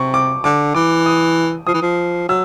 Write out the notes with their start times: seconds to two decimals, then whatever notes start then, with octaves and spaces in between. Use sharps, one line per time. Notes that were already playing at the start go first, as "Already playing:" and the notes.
Already playing: C3 C#6
0.14 D6
0.44 D3 D6
0.75 E3 D6
1.06 D#6
1.67 F3 D#6
1.74 E3
1.82 F3
2.28 F#3 E6